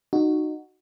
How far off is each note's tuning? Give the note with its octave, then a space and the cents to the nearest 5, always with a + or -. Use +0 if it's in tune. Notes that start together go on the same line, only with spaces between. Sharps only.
D#4 -20 F#4 +0